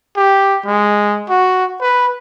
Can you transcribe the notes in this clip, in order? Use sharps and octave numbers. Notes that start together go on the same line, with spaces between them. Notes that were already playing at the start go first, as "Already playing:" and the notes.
G4
G#3
F#4
B4